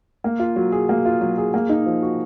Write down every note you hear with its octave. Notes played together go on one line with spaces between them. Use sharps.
A#3
F4
F#3
G#4
A#3
F4
F#3
G#4
A#3
D#4
F3
F#4